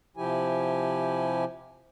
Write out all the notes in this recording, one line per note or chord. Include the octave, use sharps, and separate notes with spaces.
C3 F3 E4 G4 G#5